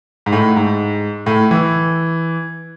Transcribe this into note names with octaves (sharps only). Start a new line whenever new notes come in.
G#2
A2
G#2
A2
E3